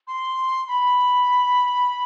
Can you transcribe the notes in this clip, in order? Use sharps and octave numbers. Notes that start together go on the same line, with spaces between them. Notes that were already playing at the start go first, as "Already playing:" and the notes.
C6
B5